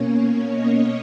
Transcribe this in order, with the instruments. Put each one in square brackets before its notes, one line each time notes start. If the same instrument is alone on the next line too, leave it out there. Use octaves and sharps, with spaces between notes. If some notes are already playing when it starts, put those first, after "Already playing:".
Already playing: [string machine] B2 A#3 C#4 C#5
D#5